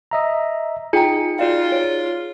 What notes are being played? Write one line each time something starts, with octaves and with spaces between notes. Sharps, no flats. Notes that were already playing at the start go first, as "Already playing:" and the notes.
D#5 E5 A#5
D#4 F4 G#4 G5 A#5 C#7
F4 F#4 D5 F5
C#5